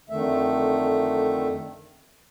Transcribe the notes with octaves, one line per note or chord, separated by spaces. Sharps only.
F2 D3 D#3 A3 E5